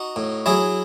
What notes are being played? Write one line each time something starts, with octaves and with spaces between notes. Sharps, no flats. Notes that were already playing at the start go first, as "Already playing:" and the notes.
Already playing: D#4 F#4
A2
F#3 E4 G#4